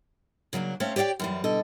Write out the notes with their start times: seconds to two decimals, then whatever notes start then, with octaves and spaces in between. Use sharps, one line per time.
0.53 C#3 F#3 A#3 D4
0.80 A3 C4 C#4 C5 C#5 F5
0.96 G4 C#5 D5 F5 G5
1.20 F#2 E3 G3
1.44 B2 D3 A4 D#5